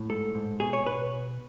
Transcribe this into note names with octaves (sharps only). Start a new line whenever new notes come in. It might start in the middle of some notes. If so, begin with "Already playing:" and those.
Already playing: A2
G#2 A4
G#2
B2 G#4
C#5
B2 B4